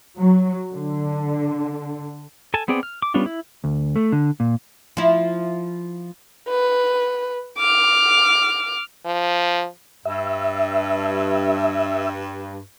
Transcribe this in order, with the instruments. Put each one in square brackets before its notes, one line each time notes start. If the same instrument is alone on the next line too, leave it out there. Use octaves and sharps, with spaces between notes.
[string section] F#3
D3
[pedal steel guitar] A4 G#5 A5
B3 C4 G#4 D5 G5
F6
D6
G3 B3 C#4 D4 F4
E4
[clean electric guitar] D2
A3
D3
A#2
[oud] F3 E4
[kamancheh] B4
D6 F6
[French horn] F3
[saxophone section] G2 [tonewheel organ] E5